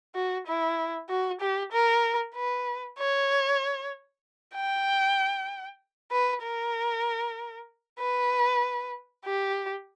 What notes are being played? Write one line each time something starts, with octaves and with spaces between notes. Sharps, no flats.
F#4
E4
F#4
G4
A#4
B4
C#5
G5
B4
A#4
B4
G4